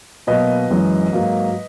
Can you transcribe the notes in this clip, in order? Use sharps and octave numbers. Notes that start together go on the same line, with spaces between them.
B2 F#3 A#3 B4 D#5
F#2 E3 G#3
G#2 F#3 A#3